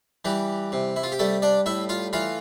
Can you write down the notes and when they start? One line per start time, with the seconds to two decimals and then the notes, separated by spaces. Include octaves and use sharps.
0.25 E3 G3 G4
0.72 C3
0.96 E4
1.03 F4
1.12 G4
1.19 G3 A3 A4
1.42 D4 D5
1.66 A2 E4 E5
1.89 F4 F5
2.13 E3 F4 F5